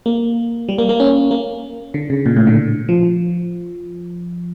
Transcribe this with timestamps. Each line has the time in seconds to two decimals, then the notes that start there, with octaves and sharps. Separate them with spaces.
0.06 A#3
0.69 G3
0.78 A#3
0.89 A#3
1.00 C#4
1.31 A#3
1.94 D3
2.10 C#3
2.26 A#2
2.36 A2
2.47 D3
2.89 F3